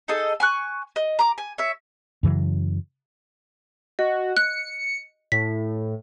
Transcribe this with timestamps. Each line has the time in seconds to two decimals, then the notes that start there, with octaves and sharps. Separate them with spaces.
0.08 D#4 G#4 A4 D#5
0.40 G#5 C#6 F#6
0.96 D#5
1.19 A#5 D6
1.38 G#5
1.58 C#5 E5
2.23 F#2 C#3 E3 F#3
3.99 F#4 D#5
4.37 F#6 C#7
5.32 A2 B6